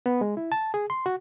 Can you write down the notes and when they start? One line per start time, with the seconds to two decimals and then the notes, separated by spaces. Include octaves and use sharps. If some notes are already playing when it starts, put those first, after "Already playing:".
0.06 B3
0.21 G#3
0.37 E4
0.52 A5
0.74 G#4
0.90 C6
1.06 F#4